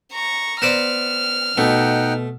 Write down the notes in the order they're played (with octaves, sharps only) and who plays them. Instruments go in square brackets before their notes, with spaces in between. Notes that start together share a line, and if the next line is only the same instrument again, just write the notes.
[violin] A#5 C#6
[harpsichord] B3 C5 D5 [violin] F6
[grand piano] B2 [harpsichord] A3 [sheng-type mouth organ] D#4 F#5 G5